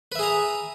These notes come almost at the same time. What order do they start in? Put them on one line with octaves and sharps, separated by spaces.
B4 E5 G#4 A#5